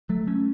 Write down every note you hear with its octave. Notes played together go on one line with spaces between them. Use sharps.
F#3 A3
A3 C#4